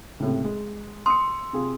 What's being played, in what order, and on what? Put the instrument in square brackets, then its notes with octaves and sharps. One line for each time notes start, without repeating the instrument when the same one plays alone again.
[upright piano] C#2 A2 C3
G#3
[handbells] C6 [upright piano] D#6 E6 C#7
[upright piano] C3 F4 G#4